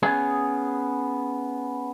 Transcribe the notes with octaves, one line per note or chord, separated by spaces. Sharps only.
B3 C#4 G#4